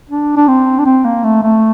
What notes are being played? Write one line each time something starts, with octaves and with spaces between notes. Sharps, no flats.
D4
D4
C4
D4
C4
A#3
A3
A3